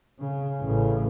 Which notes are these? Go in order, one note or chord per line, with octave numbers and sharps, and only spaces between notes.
C#3
A1 C#3